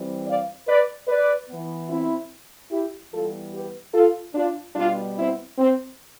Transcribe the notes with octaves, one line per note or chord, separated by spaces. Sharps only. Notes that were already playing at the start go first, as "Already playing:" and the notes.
Already playing: E3 G3 C4
D5 F5
B4 D5
B4 D5
E3 B3
C4 E4
E4 G4
E3 G3 B3 F4 A4
G4 B4
F4 A4
D4 F4
B2 G3 B3 D4 F4
C4 E4
C4